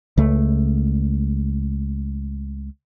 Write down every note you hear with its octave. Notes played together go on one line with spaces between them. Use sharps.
C#2 A3